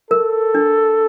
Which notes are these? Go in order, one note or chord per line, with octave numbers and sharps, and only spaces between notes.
A4 A#4
D4